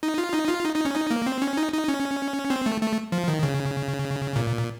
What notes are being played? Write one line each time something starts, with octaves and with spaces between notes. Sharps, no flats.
D#4
F4
D#4
F4
D#4
D#4
C#4
D#4
A#3
C4
C#4
D#4
D#4
C#4
C4
A3
A3
F3
D#3
C#3
A#2